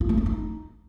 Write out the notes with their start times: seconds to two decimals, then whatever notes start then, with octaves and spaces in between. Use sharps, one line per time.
0.01 F4
0.09 A3
0.18 D4
0.26 D#4